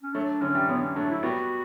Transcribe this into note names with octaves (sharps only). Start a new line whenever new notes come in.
C#4
F#3 A3 D4
D3 F#3 C#4
E3 G3
D3 F#3 B3
C#4
F#3 A3 D4
E4
G3 B3 F#4